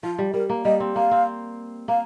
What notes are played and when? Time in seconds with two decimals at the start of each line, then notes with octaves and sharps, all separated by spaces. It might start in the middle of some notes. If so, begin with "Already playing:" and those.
0.03 F3 F4
0.19 G3
0.34 G3 A#4
0.50 A#3
0.65 G3 D#5
0.80 C4
0.95 A#3 F5
1.11 C4
1.88 A#3 F5